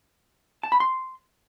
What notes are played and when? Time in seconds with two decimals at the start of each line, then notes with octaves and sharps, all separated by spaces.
0.63 A5
0.72 B5
0.80 C6